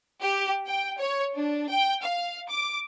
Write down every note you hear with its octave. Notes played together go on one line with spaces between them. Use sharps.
G4
G5
C#5
D4
G5
F5
D6